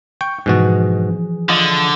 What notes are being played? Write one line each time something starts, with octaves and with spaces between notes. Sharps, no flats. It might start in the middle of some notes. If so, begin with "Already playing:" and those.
G5 C#6
G#2 B2 E3 F3 F#4 G#4
D3 F4 D#5